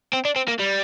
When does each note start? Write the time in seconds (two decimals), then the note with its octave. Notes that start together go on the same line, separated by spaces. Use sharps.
0.13 C4
0.25 D4
0.36 C4
0.48 A#3
0.59 G3